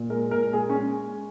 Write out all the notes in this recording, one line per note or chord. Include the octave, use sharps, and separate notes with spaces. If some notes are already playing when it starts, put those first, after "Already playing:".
Already playing: A#2
G#3 A#4
A#2 A#4
G#3 G#4
C#4
G#3